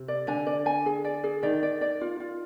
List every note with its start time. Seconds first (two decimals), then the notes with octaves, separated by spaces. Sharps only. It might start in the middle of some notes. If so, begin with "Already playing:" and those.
Already playing: C3
0.08 D5
0.27 D3 G#5
0.47 D5
0.66 G#5
0.86 G#4
1.04 D5
1.24 G#4
1.43 D#3 D5
1.63 D5
1.81 D5
2.01 F4
2.20 F4